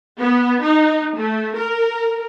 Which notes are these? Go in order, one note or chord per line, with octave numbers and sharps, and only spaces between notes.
B3
D#4
A3
A#4